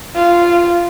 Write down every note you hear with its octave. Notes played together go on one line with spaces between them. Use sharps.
F4